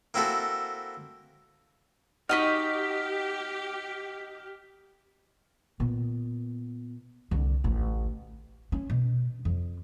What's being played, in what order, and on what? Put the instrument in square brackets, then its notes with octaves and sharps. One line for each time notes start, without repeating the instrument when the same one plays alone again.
[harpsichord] A#3 C4 E4 F#4 A4
[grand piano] D#4 [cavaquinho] F#4 D#5 C#6 [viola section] G4 [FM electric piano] F6 B6
[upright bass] A#2 B3
C2 D3
A1 D2
C#4
B2
F2